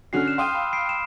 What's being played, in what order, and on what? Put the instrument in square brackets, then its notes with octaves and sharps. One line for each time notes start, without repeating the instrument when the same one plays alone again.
[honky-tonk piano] D3 C#4 F#4 [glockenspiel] F6 F#6 C7
[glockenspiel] F6 E7
[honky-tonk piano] F5 G5 [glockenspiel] C6 D#6 D#7
[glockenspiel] B5 E6
B5 C7 D7
E7